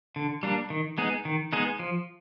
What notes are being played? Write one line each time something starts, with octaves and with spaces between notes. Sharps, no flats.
D3
G3 A#3 D4
D#3
G#3 B3 D#4 G#4
D#3
G#3 B3 D#4 G#4
F3